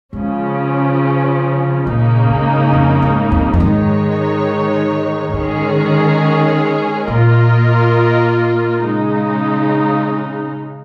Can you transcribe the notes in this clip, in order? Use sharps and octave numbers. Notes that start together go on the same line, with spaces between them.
C#3 F3 G#3 C#4
A#2 C#3 A#3 D#4
G#2
F2
G#2
F2
F2
G#2 D#3 G#3 D#4 C#5
G#2 D#3 G#3 C#4 G#4 C#5
A#2 A#3 F4 A#4 D#5
C#3 G#3 D#4